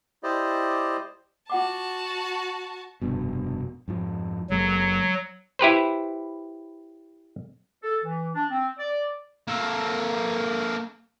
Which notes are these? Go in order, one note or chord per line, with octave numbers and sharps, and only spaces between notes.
E4 G4 C5 D5 D#5
F4 F#4 F#5 A5 D6
F1 G2 B2
F2 G#2 F3
F#1 F#3 G#3 A#3
E4 G4 B4 C5
A4
E3
D4
C4
D5
A#3 A4